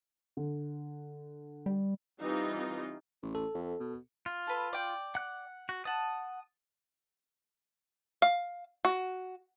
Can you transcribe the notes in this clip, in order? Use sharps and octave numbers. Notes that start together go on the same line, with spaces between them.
D3
G3
E3 G3 C4 D#4 F4
A1
A4
F2
B2
F4
A4 B4
D5 G5
F#5 F#6
F#4
F#5 A5 D#6
F5
F#4